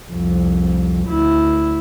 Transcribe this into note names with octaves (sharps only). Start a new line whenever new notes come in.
C2 F2
D2 E4